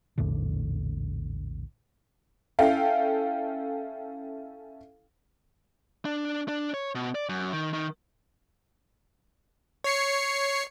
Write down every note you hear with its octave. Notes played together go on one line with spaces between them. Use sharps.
A#1 E2 A2 D3
C#4 E4 A4 F5 G5
D4
D4
C#5
B2
D5
F#2
D#3
D#3
C#5 C7 C#7